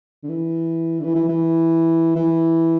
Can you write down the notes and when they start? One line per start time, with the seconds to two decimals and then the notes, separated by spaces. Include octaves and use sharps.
0.23 D3
0.29 E3
1.00 D3
1.04 E3
1.16 E3
1.29 E3
2.16 E3